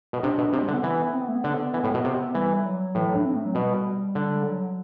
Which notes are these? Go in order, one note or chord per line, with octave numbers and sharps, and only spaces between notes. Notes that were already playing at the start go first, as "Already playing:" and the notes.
B2
C3 D4
B2
C3 C4
G3
D3
B3
E3
C4
B3
A3
B3
D3
E3
A2
B2
C3
E3 G3
F#3
A2 E3
F#3
D4
C4
A3
F#3
B2 G3
D3
G3
F#3